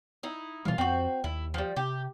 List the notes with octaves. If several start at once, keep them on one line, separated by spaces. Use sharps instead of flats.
D#4 E4
B2 E3 G3 F4 F5
F2 C4 F#4
D#2 E4
F3 G3
C3 G4